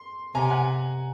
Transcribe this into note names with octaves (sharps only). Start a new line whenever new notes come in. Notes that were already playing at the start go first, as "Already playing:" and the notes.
Already playing: C6
C3 G#5 A#5
F#5 G#5